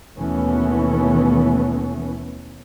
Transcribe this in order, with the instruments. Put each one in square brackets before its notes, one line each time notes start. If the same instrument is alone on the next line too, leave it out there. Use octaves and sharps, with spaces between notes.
[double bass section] D#2 B2 E3 A3 B3 C#4